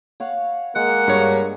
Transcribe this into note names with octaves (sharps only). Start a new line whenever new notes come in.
C#5 F5 F#5
G#3 A#3 F#5
G2 G#4 C#5